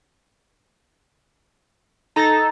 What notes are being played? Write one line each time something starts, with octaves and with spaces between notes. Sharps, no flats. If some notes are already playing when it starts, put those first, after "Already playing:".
D#4 A4 A#5 A6